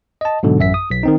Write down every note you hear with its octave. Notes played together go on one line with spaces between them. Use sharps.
D#5 A5
G#2 B2 D3 F#3
A1 F#2 E5 B6
D#6
B1 B6
D#3 C4 D#4